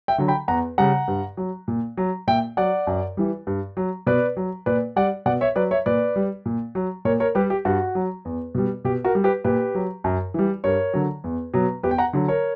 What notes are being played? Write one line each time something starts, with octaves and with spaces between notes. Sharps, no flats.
E5 G5
D3 F#3
G5 B5
E2 F#5 A#5
C#3 G3 F#5 A#5
G2
F#3
A#2
F#3
A#2 E5 G5
F#3 D5 F#5
F#2
E3 G3
G2
F#3
B2 B4 D5
F#3
A#2 B4 D5
G3 D5 F#5
B2 D5 F#5
C#5 E5
F#3 B4 D5
C#5 E5
A#2 B4 D5
G3
A#2
F#3
A#2 A#4 C#5
A#4 C#5
G3 G4 B4
G4
G2 F#4
F#3
E2
B2 G3
B2 G4
F#4 A#4
G3
G4 B4
A#2 G4 B4
F#3
F#2
E3 G3
G2 A#4 C#5
D3 F#3
E2
B2 F#3
E2 G4 B4
G5
F#5 A#5
D3 F#3
A#4 C#5